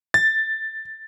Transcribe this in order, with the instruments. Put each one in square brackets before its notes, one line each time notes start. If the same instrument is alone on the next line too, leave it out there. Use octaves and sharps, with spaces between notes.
[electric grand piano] A6